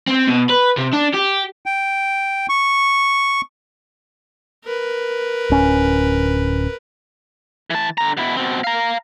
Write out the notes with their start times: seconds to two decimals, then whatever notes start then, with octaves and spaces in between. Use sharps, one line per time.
0.07 C4
0.28 B2
0.49 B4
0.77 C3
0.93 D4
1.14 G4
1.66 G5
2.49 C#6
4.64 A#4 B4
5.50 D1 C#4
7.70 E3 A5
7.98 D3 A#5
8.17 B2 E4
8.37 B2 C4
8.64 F5 A#5